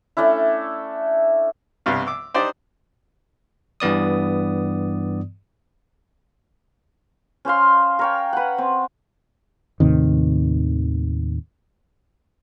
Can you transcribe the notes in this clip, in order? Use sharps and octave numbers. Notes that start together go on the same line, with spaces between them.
A3 C#4 D4 E4
B1 G2 C3 F5
D6 E6
D4 D#4 G4 C5 D5
G2 E3 B3 D5 D#6
C#4 C5 F5 C6
A#4 C#5 G5
B4 F#5
C4
D#2 A2 C3 D#3